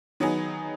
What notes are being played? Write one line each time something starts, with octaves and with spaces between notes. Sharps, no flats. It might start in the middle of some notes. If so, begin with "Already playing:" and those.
D#3 F#3 B3 D#4 G#4